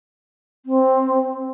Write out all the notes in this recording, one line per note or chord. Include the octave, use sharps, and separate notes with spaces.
C4